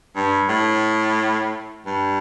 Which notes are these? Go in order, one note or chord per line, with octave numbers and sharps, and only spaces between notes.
G2
A2
G2